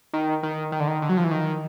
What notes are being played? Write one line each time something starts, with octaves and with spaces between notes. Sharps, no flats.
D#3
D#3
D#3
D3
D#3
D3
F#3
F3
E3
D#3